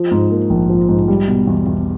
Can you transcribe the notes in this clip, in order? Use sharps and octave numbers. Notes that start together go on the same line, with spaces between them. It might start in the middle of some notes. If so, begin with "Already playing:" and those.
Already playing: F3
G#2
A#3
A#1
F3
G#2
G3
B2
E2
E2